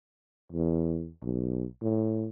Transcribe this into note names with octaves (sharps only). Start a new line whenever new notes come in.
E2
B1
A2